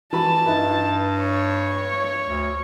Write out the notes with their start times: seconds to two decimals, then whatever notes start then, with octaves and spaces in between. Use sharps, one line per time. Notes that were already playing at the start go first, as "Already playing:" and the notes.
0.13 E3 F#4 A5 B5
0.46 G2 D#4 E4 B4
1.21 C#5
2.26 D2